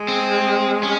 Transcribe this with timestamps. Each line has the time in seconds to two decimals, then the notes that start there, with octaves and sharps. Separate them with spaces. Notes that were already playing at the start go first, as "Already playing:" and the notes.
Already playing: G#3
0.08 C4
0.83 C#4